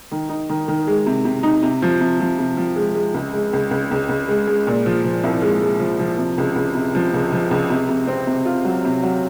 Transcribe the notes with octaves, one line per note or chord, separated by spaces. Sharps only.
D#3
D#4
D#3
D#3
G#3
C3
C3
D#4
C3
F3
C3
F3
C3
F3
G#3
G#3
C#2
G#3
C#2
C#2
C#2
C#2
G#3
G#3
A#2
F3
F3
C2
G#3
G#3
F3
F3
C3
C#2
C#2
C3
F3
C#2
F3
C#2
C3
C3
C4
C3
F4
F#3
C3
F#3